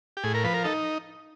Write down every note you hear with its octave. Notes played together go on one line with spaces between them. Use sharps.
G4
A2 G#4
A#4
F3 B4
A#4
D#4 A4